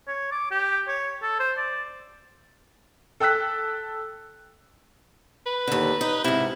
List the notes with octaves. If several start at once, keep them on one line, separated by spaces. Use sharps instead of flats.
C#5
D6
G4
C#5
A4
C5
D5
A4 G5 E6 F#6 B6
B4
D#2 D3
D#4
G#2 C3 E4